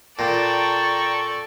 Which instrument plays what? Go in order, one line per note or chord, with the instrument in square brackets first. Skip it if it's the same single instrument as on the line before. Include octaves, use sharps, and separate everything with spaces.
[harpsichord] A#2 [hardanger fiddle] A4 D5 [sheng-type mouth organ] G5 A5 A#5 [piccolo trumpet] C#6